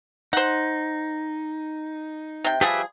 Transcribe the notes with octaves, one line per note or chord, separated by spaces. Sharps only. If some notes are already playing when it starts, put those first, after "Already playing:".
D#4 C5 F#5
C3 G5
F3 G3 G4 G#4 B4 E5